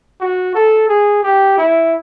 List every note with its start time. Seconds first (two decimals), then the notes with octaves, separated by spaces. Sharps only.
0.21 F#4
0.55 A4
0.89 G#4
1.23 G4
1.58 E4